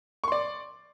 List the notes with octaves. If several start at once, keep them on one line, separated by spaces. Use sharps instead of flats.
D5 C6 C#6